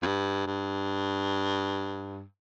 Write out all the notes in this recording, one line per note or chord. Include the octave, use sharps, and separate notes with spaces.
F2
G2
G2